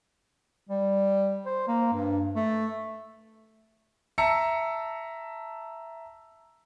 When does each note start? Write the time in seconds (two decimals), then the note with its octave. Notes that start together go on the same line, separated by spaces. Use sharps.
0.69 G3
1.46 C5
1.68 A#3
1.93 G2
2.35 A3
4.18 E5 A5 A#5 E6 C#7